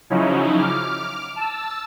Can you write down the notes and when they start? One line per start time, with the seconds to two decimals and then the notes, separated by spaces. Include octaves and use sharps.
0.10 C#3 F3 F#3 C#4 D#4 E4
0.58 D6 F6
1.36 A5 E6